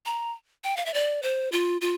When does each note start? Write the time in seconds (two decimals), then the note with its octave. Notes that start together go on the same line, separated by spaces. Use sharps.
0.06 A#5
0.64 G5
0.77 F5
0.86 E5
0.94 D5
1.23 C5
1.52 F4
1.81 F4